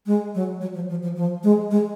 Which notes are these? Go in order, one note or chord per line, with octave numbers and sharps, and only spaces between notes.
G#3
F#3
F#3
F3
F3
F3
F3
G#3
G#3